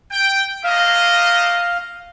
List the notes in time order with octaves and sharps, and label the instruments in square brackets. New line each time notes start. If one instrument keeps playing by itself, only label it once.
[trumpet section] G5
[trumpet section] A3 A#3 D#5 [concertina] F5